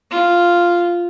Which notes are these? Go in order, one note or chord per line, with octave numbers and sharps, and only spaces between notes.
F4